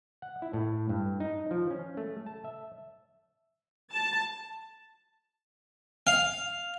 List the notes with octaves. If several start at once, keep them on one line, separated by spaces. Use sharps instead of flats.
F#5
E4
A2
G2
D#4
F3
C#4
A3
A5
E5
A5
F5